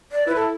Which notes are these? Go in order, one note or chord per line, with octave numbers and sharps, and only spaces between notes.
D5
E4 B4
A4